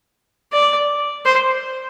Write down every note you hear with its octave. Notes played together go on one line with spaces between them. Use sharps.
D5
C5